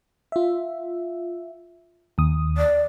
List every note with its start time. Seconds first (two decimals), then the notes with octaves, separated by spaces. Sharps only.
0.32 F4 E5
2.18 D#2 D#6
2.58 D5